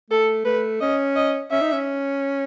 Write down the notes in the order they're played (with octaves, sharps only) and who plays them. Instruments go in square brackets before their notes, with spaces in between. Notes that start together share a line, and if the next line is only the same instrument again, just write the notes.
[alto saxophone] A3 [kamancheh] A4
[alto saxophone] A3 [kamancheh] B4
[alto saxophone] C#4 [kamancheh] D#5
[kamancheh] D#5
[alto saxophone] C#4 [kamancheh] E5
[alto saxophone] D#4
C#4